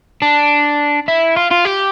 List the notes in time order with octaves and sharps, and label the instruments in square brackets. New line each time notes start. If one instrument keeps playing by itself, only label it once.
[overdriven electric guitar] D4
E4
F4
F4
G4